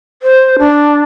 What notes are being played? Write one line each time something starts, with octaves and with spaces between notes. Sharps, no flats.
C5
D4